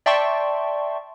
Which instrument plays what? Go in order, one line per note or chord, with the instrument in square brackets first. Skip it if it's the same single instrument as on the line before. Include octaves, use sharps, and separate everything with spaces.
[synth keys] D5 E5 G5 A5 C6 C#6